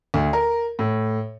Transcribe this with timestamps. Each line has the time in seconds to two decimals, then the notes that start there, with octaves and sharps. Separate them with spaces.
0.14 D2
0.33 A#4
0.79 A2